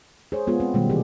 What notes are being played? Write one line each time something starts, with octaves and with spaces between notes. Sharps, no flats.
G#4 C5 C#5
G#3 B3 F4 G#4
C4
B2 D#3 G3 G#3 A#3
C3 E3 E4 G4 G#4